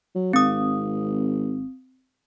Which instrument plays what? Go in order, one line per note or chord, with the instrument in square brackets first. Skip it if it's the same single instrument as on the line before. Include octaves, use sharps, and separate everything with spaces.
[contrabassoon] F#3
[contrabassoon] G#1 [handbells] C4 D#6